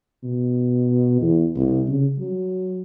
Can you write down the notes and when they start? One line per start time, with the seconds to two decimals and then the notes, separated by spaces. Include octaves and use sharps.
0.23 B2
1.21 E2
1.55 C2
1.88 C#3
2.19 F#3